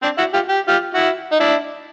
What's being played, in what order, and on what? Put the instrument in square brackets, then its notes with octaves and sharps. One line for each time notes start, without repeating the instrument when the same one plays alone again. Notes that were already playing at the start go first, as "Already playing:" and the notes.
[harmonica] C4 D4
E4 F#4
F4 G4
G4
F4 G4
E4 F#4
D#4
D4 E4